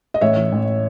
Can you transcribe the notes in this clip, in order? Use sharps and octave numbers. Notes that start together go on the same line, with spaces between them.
D#5
A1 C#5 E5
E3
A1